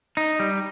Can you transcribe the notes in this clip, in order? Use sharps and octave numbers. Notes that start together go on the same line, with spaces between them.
D#4
G3